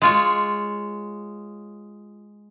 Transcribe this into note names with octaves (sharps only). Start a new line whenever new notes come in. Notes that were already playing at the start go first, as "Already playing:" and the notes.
G#3 F4 C#5